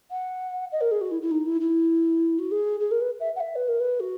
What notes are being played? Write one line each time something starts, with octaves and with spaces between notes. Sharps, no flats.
F#5
D#5
A#4
G#4
F#4
E4
E4
D#4
E4
E4
F#4
G#4
G#4
A#4
B4
E5
F#5
E5
B4
A#4
B4
F#4